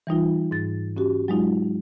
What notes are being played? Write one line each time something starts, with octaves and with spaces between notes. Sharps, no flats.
E3 G3 D#4 F4
G#2 A6
C#4 F#4 G4
F#3 G#3 D#4 F4